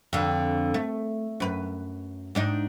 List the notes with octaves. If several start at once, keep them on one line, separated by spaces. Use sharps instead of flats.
F2 D3
A3
F#2 B4
G#2 D4 D#4